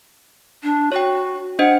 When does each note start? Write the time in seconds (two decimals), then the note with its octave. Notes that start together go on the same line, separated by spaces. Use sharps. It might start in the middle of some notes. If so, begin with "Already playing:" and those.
0.63 D4
0.92 F#4 C#5 G5
1.59 D4 C5 D#5 F#5